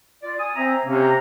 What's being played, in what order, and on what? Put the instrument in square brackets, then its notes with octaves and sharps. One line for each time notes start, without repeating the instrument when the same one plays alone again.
[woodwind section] F4 D5
G#5 D#6
[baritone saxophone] C4 [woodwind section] E5 G#5 A#5
[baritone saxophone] C3 [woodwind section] A#3 C#4
[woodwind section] A#5